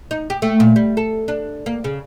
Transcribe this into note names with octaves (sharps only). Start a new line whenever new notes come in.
D#4
G4
A3
A#2
G3
A4
D4
A#3
C#3